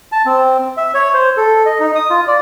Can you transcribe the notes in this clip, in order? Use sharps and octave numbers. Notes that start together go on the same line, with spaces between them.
A5
C4
E5
C#5
C5
A4
D#5
D#4
D#6
F4
D5